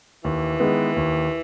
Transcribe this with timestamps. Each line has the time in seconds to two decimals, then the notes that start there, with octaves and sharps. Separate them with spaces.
0.24 D#2 E3
0.60 D#3 G#3 B3
0.97 D#2